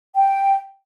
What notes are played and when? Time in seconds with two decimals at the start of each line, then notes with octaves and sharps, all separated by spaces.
0.15 G5